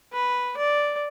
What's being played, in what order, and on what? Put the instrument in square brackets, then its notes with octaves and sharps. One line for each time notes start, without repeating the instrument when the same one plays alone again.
[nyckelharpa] B4
D5